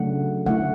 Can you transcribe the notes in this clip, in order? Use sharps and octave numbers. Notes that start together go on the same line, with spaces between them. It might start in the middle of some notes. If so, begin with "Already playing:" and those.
Already playing: C#3 F#3 A3 D4 F#5
D3 A3 E4 F#5